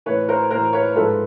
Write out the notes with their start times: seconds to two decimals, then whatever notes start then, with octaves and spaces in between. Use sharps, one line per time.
0.06 A2 E3 B4 C#5
0.29 A#4 C5
0.51 A2 E3 A#4 C5
0.73 B4 C#5
0.95 G#2 F3 A4 B4